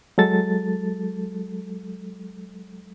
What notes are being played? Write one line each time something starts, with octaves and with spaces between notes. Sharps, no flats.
F#3 G#3 A4 A6